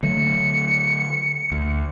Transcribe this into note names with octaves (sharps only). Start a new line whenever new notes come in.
D3 F#3 A3 C#7
D2